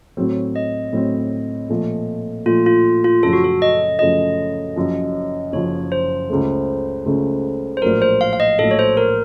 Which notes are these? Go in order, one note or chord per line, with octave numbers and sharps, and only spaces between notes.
A2 F#3 C4
D#5
A2 F#3 C4
A#2 F3 A3
A#2 F3 A3 F4
F4
F4
F#2 C#3 F3 A3 A4
F#4
A4
D#5
F#2 C#3 F3 A3 D#5
F#1 F#2 F3
F#1 F#2 F3 C#5
C5
C#2 C#3 A3
C#2 C#3 A3
C5
A#1 A2 F#3 A#4
C5
F5
F5
D#5
A#1 A2 F#3 A4
C#5
C5
A#4